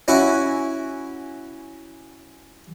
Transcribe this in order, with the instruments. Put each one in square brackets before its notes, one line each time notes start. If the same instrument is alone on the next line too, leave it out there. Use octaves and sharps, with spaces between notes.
[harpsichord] C#4 E4 F#4